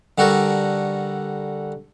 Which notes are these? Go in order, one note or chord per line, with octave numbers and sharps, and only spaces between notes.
D3 G3 F#4 A4 A#4